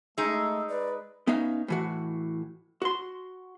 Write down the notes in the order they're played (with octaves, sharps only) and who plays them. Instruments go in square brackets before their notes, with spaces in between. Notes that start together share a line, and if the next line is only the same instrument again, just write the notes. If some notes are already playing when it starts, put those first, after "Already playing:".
[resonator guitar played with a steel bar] G#3 D#4 [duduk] A3 [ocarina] E6
[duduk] B4 [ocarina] D5
[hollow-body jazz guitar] B3 C#4 D#4 E5 F5
A2 E3 F#4
F#4 C6